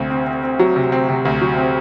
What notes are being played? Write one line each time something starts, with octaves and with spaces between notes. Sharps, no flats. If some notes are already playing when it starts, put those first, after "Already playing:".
Already playing: D2 C3 C4
C4
C4
C4
F#3
C3
C4
C3
D2
F#3
C4